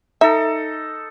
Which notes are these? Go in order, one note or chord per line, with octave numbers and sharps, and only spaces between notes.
D#4 A4 E5